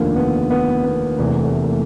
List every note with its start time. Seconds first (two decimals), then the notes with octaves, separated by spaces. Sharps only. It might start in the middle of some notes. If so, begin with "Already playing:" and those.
Already playing: F1 D#2 D3 F3 A#3
0.16 B3
0.50 B3
0.84 B3
1.18 F1 E2 C3 E3 A#3
1.41 A3
1.64 A#3